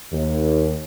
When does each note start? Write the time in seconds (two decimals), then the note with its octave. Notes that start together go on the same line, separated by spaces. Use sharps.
0.12 D#2